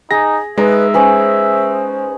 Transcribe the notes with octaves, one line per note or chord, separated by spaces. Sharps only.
D#4 G#4 A#6
G#3 D#4 B4 D#5 E5
C#4 G#4 B4 C5